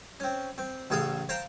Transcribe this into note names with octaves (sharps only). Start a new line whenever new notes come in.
C4 C#4
C4
A1 C#3 G#4 A4 F5
C5 F5 G5 A5 A#5